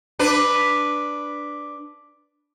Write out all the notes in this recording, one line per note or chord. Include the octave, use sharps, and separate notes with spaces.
D4 B4